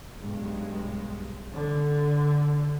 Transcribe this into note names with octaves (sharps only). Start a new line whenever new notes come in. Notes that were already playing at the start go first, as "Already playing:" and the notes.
B1 G2 G#3
D3